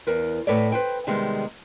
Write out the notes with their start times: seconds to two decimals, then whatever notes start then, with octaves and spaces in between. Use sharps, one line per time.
0.07 E2 A#4 B4
0.47 A2 A4 B4 C#5 D5
0.72 B4 C5 G5
1.07 C3 D#3 G3 G#3 B3